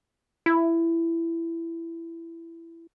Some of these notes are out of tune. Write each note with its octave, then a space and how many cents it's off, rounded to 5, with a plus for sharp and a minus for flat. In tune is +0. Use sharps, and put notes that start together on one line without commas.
E4 +15